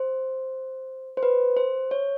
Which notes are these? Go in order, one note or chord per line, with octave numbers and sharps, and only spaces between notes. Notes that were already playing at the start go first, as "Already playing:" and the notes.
Already playing: C5
C5
B4
C5
C#5